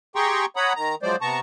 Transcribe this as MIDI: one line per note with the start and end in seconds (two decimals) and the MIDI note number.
0.16 0.46 67
0.16 0.46 68
0.16 0.46 79
0.16 0.46 82
0.16 0.46 84
0.16 0.46 85
0.56 0.73 73
0.56 0.73 78
0.56 0.73 82
0.56 0.73 83
0.56 0.73 87
0.76 0.95 51
0.76 0.95 82
1.03 1.16 53
1.03 1.16 54
1.03 1.16 56
1.03 1.16 72
1.03 1.16 74
1.21 1.40 48
1.21 1.40 59
1.21 1.40 81
1.21 1.40 82
1.21 1.40 85